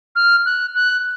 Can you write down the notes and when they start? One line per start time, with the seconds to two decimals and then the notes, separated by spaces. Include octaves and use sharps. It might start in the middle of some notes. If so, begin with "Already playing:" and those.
0.16 F6
0.46 F#6
0.75 F#6